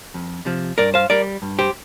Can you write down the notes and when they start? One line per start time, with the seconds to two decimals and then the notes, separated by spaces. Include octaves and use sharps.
0.14 F2
0.45 C3 F3
0.78 G2 A#4 D5
0.94 C5 F5
1.10 G3 A#4 D5
1.42 G2
1.59 G4 C5